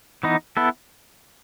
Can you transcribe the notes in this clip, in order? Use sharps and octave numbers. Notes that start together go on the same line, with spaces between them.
E3 B3 D#4
B3 E4 A4